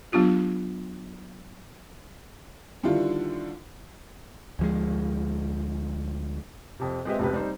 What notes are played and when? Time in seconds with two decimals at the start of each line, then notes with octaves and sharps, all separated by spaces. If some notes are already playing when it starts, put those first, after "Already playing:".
0.12 F#3 B3 D4 F4 G4
2.83 D3 D#3 G3 D4 E4 F4
4.59 D2 F3 G#3
6.80 F2 C3
7.05 G#3 C4 G4 B4 D#5 E5
7.19 F1 C#2 C3 G4 B4
7.34 G3 C4 D#4 C5